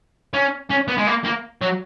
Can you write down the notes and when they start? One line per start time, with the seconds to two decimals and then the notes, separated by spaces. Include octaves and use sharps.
0.34 C#4
0.70 C#4
0.88 B3
0.98 G#3
1.07 A#3
1.25 A#3
1.62 F#3